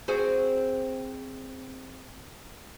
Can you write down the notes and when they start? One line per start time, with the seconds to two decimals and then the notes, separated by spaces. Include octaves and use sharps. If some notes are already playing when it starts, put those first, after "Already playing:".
0.08 C4 F#4 G#4